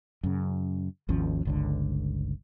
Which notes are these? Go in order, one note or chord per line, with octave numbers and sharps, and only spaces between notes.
F#2 C#3
G#1 D#2 F3 C#4
G1 C#2 D3